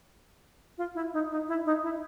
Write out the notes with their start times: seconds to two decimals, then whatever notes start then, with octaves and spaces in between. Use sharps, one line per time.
0.78 F4
0.95 E4
1.13 D#4
1.31 D#4
1.48 E4
1.66 D#4
1.83 E4